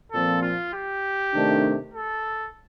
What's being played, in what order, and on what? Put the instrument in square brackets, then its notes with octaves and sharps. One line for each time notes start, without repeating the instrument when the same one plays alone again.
[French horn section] A#2 F3 C4 [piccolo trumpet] A4
[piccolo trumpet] F4
G4
[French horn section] C3 D#3 A3 D4
[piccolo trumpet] A4